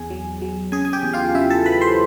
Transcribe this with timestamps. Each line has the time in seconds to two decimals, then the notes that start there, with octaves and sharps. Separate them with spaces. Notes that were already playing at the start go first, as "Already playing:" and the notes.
Already playing: E2 G#4 G#5
0.10 F#3
0.42 F#3
0.72 C#3 G#4 G#5
0.85 G#5
0.93 G4 G5
1.03 E2
1.13 F4 F5
1.34 C#3 E4 E5
1.50 A4 A5
1.65 F#3 B4 B5
1.81 C5 C6